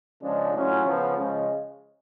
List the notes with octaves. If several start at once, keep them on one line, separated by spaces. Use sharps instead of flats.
C#3 F3 G#3 D4
A2 F#3 C#4 F4
C#3 F3 B3
C#3 F3 G#3